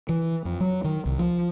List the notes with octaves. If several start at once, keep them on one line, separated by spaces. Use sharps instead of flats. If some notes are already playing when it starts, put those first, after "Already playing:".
E3
F2
F#3
D#3
C2
F3